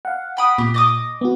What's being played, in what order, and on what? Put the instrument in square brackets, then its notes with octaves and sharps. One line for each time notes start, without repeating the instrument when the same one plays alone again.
[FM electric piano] F5 F#5
[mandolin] G5 B5 D#6
[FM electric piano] A#2 [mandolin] G4
[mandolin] D#5 D6 D#6
[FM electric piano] B3 F#4